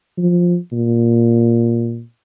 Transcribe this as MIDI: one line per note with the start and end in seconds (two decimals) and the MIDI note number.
0.17 0.57 53
0.73 2.02 46